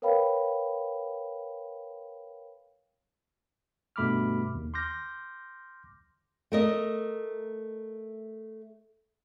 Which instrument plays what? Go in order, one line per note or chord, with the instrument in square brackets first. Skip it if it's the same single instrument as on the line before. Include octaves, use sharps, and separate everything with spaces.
[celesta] A#4 B4 C#5 F5 G5 B5
[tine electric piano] G2 B2 A3 B5 D6 F6
D#2
C6 D6 F6 G6 A#6
[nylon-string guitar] A3 A#4 D#5